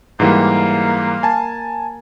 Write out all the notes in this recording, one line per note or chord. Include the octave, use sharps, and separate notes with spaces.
G#2 E3 G3 A#3
G#5 A5